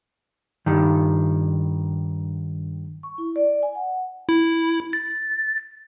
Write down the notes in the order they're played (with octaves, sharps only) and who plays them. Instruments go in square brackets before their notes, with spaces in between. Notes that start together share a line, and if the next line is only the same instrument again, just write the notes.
[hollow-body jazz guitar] G2 D#3
[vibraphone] C#6
E4
D5
G#5
F#5
[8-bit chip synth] E4
A6